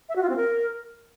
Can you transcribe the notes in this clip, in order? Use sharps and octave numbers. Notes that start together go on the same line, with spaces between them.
E5
F#4
F4
C4
A#4